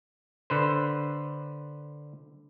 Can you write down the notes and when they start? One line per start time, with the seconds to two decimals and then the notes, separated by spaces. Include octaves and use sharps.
0.50 D3 B4 C5